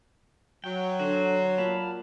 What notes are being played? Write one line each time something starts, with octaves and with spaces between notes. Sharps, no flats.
F#3 G5
D3 F#4 C5
A#2 F5 A5 B5